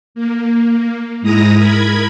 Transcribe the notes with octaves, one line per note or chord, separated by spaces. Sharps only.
A#3
G#2 G#3 E4 A#5 D#6 A#6
A#4 B5 G#6